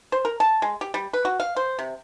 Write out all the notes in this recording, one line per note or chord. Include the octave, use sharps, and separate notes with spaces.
C5
A#4
A5
G#3
G4
G3
B4
F#4
F5
C5
C3